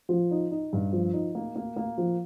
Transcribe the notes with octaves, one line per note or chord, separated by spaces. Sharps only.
F3
D#4
D#4
G2
F3
D#4
A#3
A#3
A#3
F3